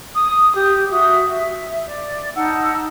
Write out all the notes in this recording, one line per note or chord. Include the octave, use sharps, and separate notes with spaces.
D#6
G4
F#4 E5 D#6
E5
D5
D#4 F#5 A5 E6